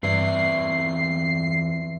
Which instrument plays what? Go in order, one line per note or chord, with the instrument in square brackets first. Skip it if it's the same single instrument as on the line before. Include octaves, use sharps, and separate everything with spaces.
[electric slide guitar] E2 C4 D5 [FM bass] G2 [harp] E3 [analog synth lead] C7